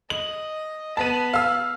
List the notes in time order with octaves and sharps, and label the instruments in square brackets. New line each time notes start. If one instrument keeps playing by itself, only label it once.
[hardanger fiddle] D#5 [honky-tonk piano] F#7
[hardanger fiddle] B3 B5 [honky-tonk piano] A5 D#7
[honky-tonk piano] F5 E6